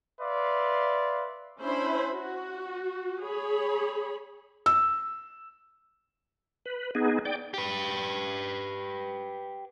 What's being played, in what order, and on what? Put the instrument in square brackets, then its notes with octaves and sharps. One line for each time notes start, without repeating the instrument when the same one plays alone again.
[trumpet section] B4 D5 E5 F5 C6
[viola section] C#4 D4 E4 C5 E5 B5
F#4
G#4 C#5 B5
[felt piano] E6
[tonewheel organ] B4
B3 D#4 G#4
D5 G5
[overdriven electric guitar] G4 B4